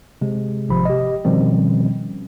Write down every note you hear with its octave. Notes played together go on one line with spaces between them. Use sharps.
C3 G#3
G#1 C3 F3 B5
G4 D#5
B2 D#3 F3 G3 C4 C#4